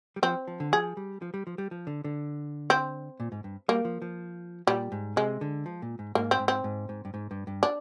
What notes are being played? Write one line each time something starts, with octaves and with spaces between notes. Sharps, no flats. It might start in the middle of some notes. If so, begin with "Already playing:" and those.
G3
F3 C4
F3
D3
F3 G#4
G3
F3
G3
F3
G3
F3
D3
D3
C4
A#2
G#2
G2
G3 A#3
F3
F3
A#2 G3
G#2
C3 G#3
D3
F3
A#2
G#2
G#2 A#3
C4
G#2
C4
G#2
G#2
G2
G#2
G2
G2
D4